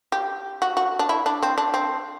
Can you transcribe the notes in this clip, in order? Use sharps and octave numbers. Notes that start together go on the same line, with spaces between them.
G4
F#4
F#4
D4
E4
D4
C4
D4
C4